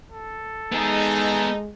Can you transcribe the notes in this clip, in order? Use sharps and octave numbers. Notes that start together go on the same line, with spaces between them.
A4
G#3 B3 D#4 G#4